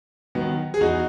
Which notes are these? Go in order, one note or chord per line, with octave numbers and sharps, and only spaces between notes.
D#3 F#3 B3
G#4
E2 D#4 F#4